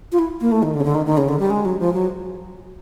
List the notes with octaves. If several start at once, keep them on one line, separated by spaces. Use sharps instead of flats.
F4
E4
A#3
A3
D#3
D3
C#3
D3
D#3
D#3
C#3
D3
G3
G#3
F#3
F3
F#3